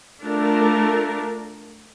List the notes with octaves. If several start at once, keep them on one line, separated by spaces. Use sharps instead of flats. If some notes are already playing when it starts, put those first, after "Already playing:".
A3 D4 F4 A#4